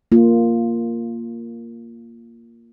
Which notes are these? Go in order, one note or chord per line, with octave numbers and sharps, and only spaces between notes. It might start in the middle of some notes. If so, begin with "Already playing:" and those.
A#3 F4